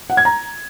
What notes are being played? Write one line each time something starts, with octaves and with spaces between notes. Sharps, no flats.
F#5
G#6
A#5